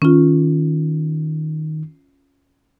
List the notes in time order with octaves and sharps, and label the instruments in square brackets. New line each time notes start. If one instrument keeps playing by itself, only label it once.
[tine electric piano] D#3 [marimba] C#4 F4